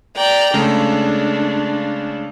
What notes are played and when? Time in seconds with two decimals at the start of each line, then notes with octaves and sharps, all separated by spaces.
0.16 D5 G5 A#5
0.54 C#3 G#3 A3 D4